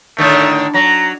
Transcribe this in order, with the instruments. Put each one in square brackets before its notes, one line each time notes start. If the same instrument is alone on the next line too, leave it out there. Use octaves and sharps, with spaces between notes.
[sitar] A2 D3 D#3 [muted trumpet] A3
[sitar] F#3 [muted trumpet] A#5